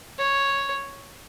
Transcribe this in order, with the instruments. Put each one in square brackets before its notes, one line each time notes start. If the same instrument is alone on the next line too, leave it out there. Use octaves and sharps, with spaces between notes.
[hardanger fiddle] C#5